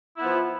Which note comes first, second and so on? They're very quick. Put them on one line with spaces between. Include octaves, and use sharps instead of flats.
E4 B3 F3